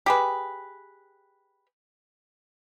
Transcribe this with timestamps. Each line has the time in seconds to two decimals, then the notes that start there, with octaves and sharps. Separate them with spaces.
0.06 G4 G#4 B4